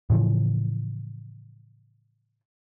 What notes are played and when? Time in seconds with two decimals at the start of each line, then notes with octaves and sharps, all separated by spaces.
0.10 A2 C#3 E3 F3